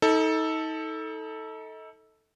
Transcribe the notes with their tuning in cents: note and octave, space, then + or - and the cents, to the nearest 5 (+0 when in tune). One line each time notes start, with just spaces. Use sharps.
D#4 +35 A4 +0